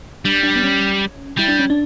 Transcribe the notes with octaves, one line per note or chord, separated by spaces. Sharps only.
G3 D4
D4
B3
C#4
G3 E4
D4
C#4
D4